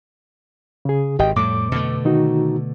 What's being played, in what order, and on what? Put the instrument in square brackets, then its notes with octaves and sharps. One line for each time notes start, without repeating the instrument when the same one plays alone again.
[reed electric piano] C#3 G#4
[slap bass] G#1 [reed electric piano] G4 D#5 G5
[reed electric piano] F2 D6 [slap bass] A2 G3
[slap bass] B2 D3 A3
[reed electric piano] D#3 D#4 F#4